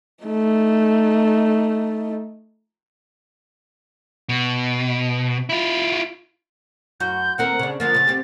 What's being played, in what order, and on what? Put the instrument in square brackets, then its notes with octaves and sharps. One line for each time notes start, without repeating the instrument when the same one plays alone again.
[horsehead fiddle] A3 D#4
[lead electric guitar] B2
E4 F4
[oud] F#2 F#4 [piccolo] G6
[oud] D#2 C4 A#4 [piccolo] F#5
[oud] C#3 D4
[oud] D3 F3 A#3 [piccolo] A6
[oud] C#3 C#4
C4 G4